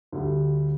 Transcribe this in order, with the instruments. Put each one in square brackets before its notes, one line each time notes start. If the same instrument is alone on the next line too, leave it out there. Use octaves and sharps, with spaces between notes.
[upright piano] D2 D3 G3